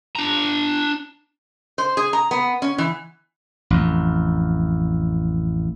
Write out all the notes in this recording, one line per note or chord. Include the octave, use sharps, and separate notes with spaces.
D4 A#5
C5
G#4
A#5
B3
C#4
E3
A1 F2